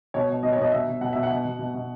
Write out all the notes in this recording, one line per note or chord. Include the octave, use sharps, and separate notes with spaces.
B2 C#5
B2
B2 D#5
C#5
B2 D#5
B2 E5
B2
B2 F#5
B2 E5
F#5
B2
B2
B2
B2